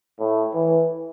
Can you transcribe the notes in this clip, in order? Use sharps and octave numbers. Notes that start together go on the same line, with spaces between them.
A2
E3